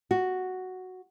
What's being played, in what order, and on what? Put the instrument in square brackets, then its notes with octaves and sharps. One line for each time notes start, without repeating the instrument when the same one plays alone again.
[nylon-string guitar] F#4